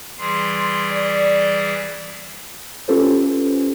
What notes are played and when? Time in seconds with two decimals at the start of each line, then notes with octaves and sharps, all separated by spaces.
0.18 E3 G3 G#4 C6
0.90 D5
2.88 C#4 F4 G4 A4 B4 C5